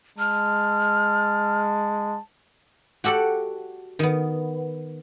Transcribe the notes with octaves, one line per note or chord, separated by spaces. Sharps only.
G#3 A5 F6
F#4 G4 A4 D5 F#5
D#3 B3